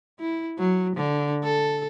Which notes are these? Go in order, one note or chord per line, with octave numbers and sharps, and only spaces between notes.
E4
F#3
D3
A4